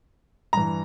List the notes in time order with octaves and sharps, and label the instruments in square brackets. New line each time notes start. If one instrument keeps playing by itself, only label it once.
[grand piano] G2 E3 A#5